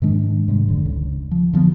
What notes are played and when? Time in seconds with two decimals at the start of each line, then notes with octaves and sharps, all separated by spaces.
0.02 G#2 D#3 G#3 D4
0.48 G#2 C3 G3 G#3
0.68 F1 D3
0.86 C#2
1.31 F3
1.53 D3 F3 A#3 B3